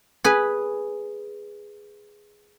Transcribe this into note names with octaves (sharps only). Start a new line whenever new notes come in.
G#4 B4